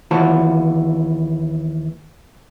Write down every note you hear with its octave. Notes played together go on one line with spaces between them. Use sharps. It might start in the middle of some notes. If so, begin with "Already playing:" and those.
D#2 E3 F4 F#4 A5